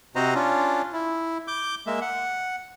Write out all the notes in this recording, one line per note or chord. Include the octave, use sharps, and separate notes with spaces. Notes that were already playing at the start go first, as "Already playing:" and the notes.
C3 C4 F#4 C5 D#5 A#5
C#4 D4 F4
E4
D6 G6
G#3 A#3 E5
F#5